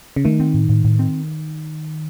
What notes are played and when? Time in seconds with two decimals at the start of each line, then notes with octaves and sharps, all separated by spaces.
0.16 C#3
0.25 D#3 A3
0.40 C4
0.54 A2
0.69 A2
0.84 A2
0.99 C4